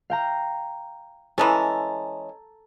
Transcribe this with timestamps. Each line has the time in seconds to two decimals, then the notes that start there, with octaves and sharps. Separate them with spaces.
0.10 F5 G5 A#5
1.38 E3 G#3 C#4 A4 A#5